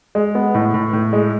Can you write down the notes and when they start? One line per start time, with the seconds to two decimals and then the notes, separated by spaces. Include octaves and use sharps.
0.15 G#3
0.35 B3
0.54 A2
0.74 A2
0.93 A2
1.13 G#3